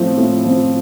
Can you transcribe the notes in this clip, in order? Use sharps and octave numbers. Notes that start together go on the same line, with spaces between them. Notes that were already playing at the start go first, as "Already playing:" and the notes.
Already playing: A2 F3 C4
A2
F3 C4